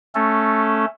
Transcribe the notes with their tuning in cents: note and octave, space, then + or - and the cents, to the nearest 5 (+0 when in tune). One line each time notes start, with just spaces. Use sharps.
A3 +0 C#4 +0 A4 +0